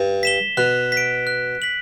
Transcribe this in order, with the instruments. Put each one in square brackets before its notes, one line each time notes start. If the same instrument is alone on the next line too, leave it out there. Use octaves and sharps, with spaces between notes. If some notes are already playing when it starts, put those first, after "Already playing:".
Already playing: [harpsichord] G2
[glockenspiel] B6 E7 G7
[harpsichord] B2 [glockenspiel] F#6
[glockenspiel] B6 D7
F#6
B6 F#7